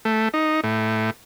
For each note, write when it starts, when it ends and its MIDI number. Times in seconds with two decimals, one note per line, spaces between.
0.05 0.29 57
0.34 0.61 63
0.64 1.10 45